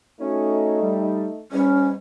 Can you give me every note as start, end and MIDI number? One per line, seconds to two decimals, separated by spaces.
0.21 1.41 57
0.21 0.77 61
0.21 1.41 63
0.21 0.77 66
0.81 1.27 55
1.52 1.95 40
1.52 1.95 44
1.52 1.95 55
1.52 1.86 61